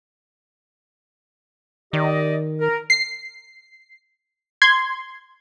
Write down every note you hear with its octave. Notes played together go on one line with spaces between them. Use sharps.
D#3 G4 D5 D#5
A#4
C7
C6 G#6